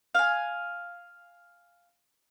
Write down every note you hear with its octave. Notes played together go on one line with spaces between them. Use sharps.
F5 G#5